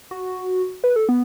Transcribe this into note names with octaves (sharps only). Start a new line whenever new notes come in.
F#4
B4
A4
B3